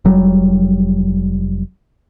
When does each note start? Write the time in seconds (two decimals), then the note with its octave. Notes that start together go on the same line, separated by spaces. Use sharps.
0.05 F1 F#3 G3